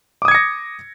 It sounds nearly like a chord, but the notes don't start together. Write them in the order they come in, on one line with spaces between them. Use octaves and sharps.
D6 D#6 G#6 C#7 A#6